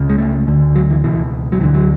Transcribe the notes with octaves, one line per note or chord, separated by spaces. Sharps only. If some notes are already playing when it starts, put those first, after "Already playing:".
Already playing: C#2 C#3
G#3
A3
D2 D3
F#3
E3
C#2 B2 E3
F#3
D2 D3 E3
F#3